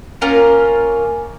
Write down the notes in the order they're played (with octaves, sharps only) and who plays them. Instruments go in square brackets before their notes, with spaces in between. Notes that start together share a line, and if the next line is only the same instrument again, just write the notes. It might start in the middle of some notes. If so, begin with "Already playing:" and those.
[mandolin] A#3 C#4 F4 A#4